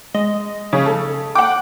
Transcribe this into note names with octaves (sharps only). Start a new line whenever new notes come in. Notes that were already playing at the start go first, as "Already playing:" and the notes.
G#3 D#5
C#3
A4
F#5 G5 D6